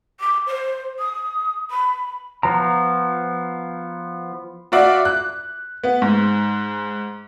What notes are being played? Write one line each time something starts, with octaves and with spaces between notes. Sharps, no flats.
D6
C5
D#6
B5
F3 B3 A#5
F4 F#4 D5 E5
F#6
B3
G#2